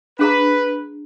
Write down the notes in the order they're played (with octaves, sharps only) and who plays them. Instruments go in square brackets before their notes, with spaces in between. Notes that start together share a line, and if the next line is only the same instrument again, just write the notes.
[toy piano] D4 G#4 A#5 [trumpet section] B4